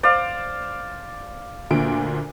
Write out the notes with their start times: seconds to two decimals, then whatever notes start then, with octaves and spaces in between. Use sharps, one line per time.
0.03 C5 D5 F5
1.71 D2 A#2 D7